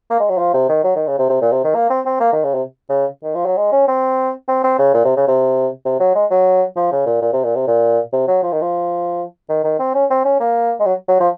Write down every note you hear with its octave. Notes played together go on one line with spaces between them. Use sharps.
A#3
G#3
F#3
F3
C3
D#3
F#3
D#3
C#3
C3
C3
A#2
C3
D#3
A#3
C4
C4
A#3
D#3
C#3
C3
C#3
D#3
F3
F#3
G#3
C#4
C4
C4
C4
C#3
A#2
C3
C#3
C3
C3
F#3
G#3
F#3
F3
C#3
A#2
A#2
C3
A#2
C3
A#2
C3
F#3
F3
D#3
F3
D#3
D#3
C4
C#4
C4
C#4
A#3
G#3
F#3
F#3
F3